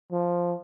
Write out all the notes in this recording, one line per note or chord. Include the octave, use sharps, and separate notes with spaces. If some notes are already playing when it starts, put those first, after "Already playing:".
F3